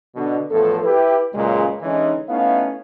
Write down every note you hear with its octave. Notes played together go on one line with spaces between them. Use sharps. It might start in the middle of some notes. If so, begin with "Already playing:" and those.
B2 D3
E2 A2 F3 B3 A4
E4 G4 B4
C#2 F#2 A#2 C#3 G#3
D3 E3 G#3 C#4 D#4
A3 B3 C#4 D#4 E4 F5